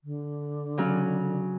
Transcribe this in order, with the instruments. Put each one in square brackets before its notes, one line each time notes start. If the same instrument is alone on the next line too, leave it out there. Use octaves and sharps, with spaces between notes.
[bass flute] D3
[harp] C#3 F#3 C#4